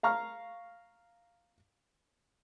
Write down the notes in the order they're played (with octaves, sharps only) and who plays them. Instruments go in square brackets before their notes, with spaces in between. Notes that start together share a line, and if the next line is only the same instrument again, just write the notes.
[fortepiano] F5 A#5 C#6 F6